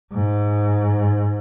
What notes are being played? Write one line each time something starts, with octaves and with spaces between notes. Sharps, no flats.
G#2